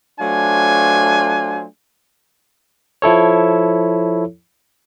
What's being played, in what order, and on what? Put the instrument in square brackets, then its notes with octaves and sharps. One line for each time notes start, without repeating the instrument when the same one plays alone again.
[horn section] F#3 A3 D4 F4 C5 G#5
[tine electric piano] F3 E4 A4 C#5